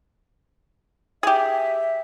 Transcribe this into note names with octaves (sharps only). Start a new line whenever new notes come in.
G4 G#4 E5